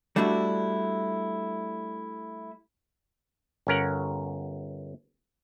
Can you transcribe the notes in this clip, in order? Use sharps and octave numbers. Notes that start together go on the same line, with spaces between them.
G3 A3 D4 E4 F#4
G1 C#4 A#4 F#5